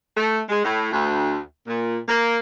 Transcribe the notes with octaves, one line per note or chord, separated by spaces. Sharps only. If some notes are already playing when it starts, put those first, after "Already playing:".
A3
G#3
A2
D2
A#2
A#3